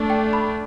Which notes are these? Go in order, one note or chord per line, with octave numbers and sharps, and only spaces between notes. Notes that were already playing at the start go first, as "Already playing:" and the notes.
Already playing: A3 D4
G5
B5